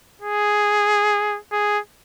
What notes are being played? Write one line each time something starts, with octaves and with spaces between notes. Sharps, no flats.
G#4
G#4